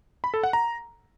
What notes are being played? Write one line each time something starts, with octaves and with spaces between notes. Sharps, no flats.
B5
A4
F#5
A#5